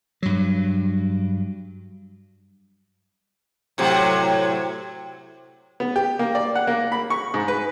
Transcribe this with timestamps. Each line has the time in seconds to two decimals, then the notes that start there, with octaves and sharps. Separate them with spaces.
0.23 G2 F#3
3.78 A2 C3 F#3
5.80 B3
5.96 G4
6.19 A#3
6.35 D5
6.55 F#5
6.67 A#3
6.92 B5
7.10 C#6
7.34 G#2
7.48 B4